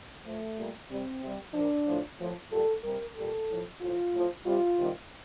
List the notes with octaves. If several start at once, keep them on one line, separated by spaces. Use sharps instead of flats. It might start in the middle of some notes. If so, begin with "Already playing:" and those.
A2 F3 A3
A#2 G3
C3 G3 C4
C3 G3
A#2 F3 D4
A2 F3
A2 F3
A#2 G3 A4
C3 G3 A#4
A#2 G3 A4
A2 F3
A2 F3 F4
A2 F3
C3 G3 F4
C3 D#3 G3